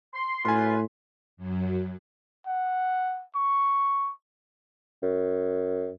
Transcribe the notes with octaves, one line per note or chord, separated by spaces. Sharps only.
C6
F#2 A2 F4 B4 G#5 C6
F#2 F#3
F#5
C#6
F#2